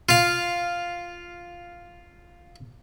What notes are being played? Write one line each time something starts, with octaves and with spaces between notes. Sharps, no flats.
F4 F5